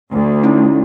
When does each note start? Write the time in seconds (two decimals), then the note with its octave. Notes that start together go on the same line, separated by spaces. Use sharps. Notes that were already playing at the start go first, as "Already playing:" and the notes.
0.11 D2
0.44 C#4 D#4 E4